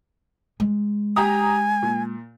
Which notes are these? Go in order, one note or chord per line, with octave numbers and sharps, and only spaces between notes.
G#3
G4 G#5 A#5 D#6
A#2